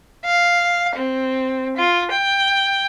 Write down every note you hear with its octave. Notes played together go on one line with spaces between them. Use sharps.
F5
C4
F4
G5